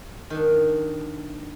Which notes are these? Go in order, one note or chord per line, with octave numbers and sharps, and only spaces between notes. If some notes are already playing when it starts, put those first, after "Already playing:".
D#3 D4